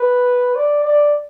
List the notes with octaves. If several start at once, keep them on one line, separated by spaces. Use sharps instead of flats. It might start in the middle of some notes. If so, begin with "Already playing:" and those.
Already playing: B4
D5
D5